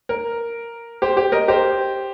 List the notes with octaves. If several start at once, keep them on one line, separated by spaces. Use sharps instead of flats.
A#4
G4 C5
G4
A#4 D#5
G4 C5